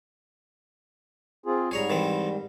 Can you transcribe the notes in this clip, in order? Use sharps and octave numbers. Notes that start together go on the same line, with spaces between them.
C4 F4 G#4
G#2 G3 G#4 C#5 A#5
D#3 E3 C4